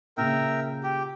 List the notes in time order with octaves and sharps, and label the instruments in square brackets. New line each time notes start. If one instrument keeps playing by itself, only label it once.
[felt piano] A#2 C#3 [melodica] A#4 E5 G5
[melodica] G4